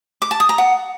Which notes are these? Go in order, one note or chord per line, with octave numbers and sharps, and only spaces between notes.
D6
A5
D#6
A#5
F#5